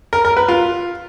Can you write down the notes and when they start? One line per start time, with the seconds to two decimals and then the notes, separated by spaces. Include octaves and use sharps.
0.13 A#4
0.25 A#4
0.37 B4
0.49 F4